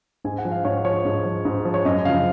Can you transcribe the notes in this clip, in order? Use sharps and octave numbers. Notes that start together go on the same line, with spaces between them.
G#2 G#5
F#5
F3
F5
G#2 C#5
F3 C#5
G#2
F3
G#2
F3
C#5
F#2 D#5
C#3 F3 F5